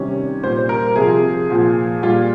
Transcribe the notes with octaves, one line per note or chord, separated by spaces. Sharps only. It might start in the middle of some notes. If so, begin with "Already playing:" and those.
Already playing: C3 D#3 G3 C#4
A#2 G3 C5
C5
A#4
C3 F3 G#4
A#2 F3
A#2 G3 F4